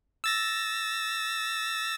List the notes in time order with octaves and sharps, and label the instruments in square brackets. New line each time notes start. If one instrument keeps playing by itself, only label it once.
[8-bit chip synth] E6 A6 A#6